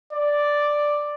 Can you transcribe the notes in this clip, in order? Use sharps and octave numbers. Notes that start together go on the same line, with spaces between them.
D5